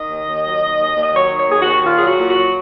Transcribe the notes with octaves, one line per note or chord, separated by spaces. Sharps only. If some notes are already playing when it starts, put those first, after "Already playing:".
Already playing: D#3 D#5
D#2
D#2
F#3
D#3
D#2
D#2
D#5
F#3 C#5
D#3
C#5
D#2 G#4
F#4
D#2
A#2 F4
F#3 G#4
F#4
A#2
F#4
F#3